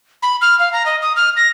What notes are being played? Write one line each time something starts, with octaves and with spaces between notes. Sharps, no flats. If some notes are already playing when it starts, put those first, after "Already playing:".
B5
F6
F5
A#5
D#5
D#6
F6
A#6